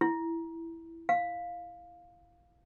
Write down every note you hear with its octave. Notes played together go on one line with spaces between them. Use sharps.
E4
F5